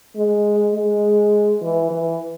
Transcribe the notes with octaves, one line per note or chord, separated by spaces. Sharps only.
G#3
G#3
E3
E3